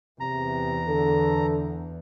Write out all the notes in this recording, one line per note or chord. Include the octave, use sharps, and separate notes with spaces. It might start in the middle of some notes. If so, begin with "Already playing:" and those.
E2 C3 A#5
D3 A4